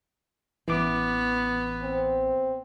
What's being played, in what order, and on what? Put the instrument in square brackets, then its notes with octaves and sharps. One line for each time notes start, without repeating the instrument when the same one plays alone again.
[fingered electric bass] A1 [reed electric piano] E3 D6 [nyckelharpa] B3
[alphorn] C4